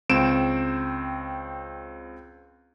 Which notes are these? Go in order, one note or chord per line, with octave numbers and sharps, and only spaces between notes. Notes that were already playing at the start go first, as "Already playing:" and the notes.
C#2 C4 D7 E7